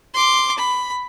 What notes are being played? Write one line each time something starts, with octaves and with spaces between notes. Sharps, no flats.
C6 D6
B5